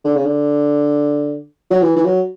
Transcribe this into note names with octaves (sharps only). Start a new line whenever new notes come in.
D3
C#3
D3
F#3
E3
E3
F#3